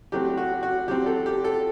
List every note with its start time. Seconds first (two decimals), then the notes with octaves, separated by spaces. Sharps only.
0.12 A2 F#3 A3 C4 G4
0.37 F#4
0.63 F#4
0.87 A2 F#3 C4 G4
1.06 A4
1.26 G4
1.45 A4